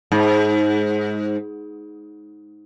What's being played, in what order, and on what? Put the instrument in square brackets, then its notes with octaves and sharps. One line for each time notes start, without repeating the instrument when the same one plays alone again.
[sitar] G#2